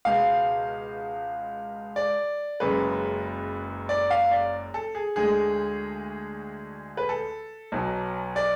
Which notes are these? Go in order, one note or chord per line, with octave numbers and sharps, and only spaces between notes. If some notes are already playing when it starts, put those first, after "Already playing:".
C#2 B2 G#3 F5
D5
F#1 F#2 C#3 G#3 B4
D5
F5
D5
A4
G#4
D2 D3 G#3 G#4
B4
A4
B1 B2 F#3
D5